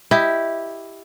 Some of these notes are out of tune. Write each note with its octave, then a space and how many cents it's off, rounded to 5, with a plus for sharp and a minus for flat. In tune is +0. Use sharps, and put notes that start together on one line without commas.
E4 +0 G4 +0 D#5 +0